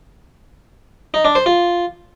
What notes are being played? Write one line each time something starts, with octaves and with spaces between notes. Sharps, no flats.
D#4
D4
C5
F4